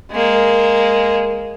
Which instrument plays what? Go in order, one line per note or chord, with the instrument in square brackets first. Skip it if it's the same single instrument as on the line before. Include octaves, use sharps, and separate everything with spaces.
[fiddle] G#3 A#3